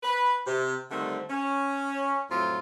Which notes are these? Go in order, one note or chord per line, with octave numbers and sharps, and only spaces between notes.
B4
C3
D3 D#3 G3 A3 C4
C#4
F2 A2 F#3 A3 C4 F4